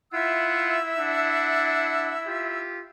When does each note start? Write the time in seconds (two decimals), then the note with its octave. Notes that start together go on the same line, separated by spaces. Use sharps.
0.13 E4 F4 E5 F#5 E6
0.98 D4 F#5
2.27 F4 G4